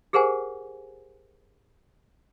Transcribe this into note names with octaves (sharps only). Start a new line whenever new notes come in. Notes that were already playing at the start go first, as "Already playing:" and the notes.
G4 G#4 A#4 C5 F#5 G#5